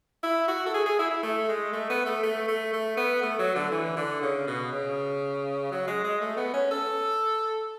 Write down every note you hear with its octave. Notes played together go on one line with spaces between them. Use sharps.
E4
F#4
A4
G#4
G#4
E4
E4
A3
G#3
A3
B3
A3
A3
A3
A3
B3
A3
F#3
D3
E3
D3
C#3
B2
C#3
F#3
G#3
G#3
A3
B3
C#4
A4